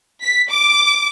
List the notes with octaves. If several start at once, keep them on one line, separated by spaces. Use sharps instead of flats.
B6
D6